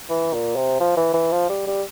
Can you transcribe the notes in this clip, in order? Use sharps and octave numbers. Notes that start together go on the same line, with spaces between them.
E3
A#2
C3
F3
E3
E3
F3
G3
G3